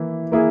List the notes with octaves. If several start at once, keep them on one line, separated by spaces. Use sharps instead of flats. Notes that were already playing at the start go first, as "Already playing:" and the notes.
Already playing: E3 A#3 E4
A#3 E4 G#4